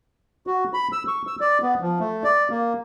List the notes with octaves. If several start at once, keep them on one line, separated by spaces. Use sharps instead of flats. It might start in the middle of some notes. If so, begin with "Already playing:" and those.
F#4
B5
E6
C#6
E6
D5
B3
F3
A3
D5
A#3